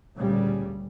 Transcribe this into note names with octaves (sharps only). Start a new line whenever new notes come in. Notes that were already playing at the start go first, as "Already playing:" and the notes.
D2 A#2 C#3 G3